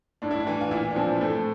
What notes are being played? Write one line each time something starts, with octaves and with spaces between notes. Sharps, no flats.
A2 D4
E4
D4
E3
F4
A#2 E4
D4
F3 C4
A2 A3